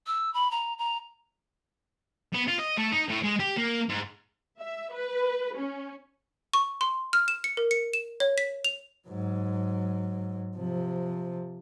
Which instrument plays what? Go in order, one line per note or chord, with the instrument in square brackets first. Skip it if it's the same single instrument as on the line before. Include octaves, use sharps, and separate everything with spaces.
[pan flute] E6
B5
A#5
A#5
[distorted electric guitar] B3
F4
D#5
A3
D#4
A2
G#3
G4
A#3
G#2
[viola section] E5
B4
C#4
[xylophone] C#6
C6
F6
E7
C#7
A#4
C#7
E7
C#5
B6
F7
[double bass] G#2 F#3
C3 F3